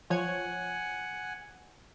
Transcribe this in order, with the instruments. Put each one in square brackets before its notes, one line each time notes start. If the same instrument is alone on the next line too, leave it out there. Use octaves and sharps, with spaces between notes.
[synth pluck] F3 C#5 G#6 [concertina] F#5 G#5